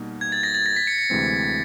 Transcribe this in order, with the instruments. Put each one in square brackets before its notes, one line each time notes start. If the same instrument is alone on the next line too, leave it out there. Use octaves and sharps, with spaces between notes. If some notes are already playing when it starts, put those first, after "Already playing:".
Already playing: [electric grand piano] B2 G3 A#3 D#4
[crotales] G#6
A6
A#6
A6
A#6
B6
C#7
C#7
[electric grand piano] D2 C3 E3 G#3 C4